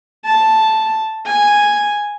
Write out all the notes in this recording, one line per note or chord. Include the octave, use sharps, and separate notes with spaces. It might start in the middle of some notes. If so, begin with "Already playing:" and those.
A5
G#5